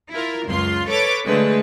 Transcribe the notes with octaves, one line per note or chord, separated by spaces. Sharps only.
E4 F4 A#4
C#2 F#2 F4 C6
A4 B4 C#5 D6 A6
D3 G#3 A3 B4